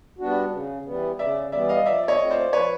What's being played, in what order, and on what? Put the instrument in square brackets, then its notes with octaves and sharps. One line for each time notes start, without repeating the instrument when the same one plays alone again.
[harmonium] G3 B3 D4 F#4
C#3
E3 G3 B3
[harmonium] C#3 [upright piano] D5 E5
[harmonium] E3 G3 B3 [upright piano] D5 E5
[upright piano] D#5 F5
[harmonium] F3 [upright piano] D5 E5
[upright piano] D5
C#5 D#5
[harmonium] A3 C4 F4
[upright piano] C5 D5
[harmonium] F3 [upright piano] B4 C#5